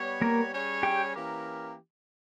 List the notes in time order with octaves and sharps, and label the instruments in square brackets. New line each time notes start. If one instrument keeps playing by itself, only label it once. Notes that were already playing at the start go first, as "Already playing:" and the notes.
Already playing: [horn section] G3 B3 G4 C#5
[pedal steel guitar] A#3 A#4
[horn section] G3 C#4 G#4 C#5
[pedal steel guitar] G4 G5
[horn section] E3 A#3 C#4 G4 A#4